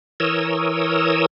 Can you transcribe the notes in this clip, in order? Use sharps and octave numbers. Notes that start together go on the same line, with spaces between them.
E3 A#4 C#5 D#6 E6